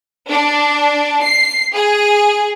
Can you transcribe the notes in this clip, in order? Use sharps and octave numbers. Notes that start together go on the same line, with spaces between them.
D4
C7
G#4